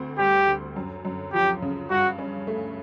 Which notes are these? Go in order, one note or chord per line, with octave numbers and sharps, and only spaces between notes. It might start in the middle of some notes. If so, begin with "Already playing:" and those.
Already playing: D2 C4
G3 G4
D3
F#2
F#2
F3 G4
C#3
G2 F#4
C#4
A3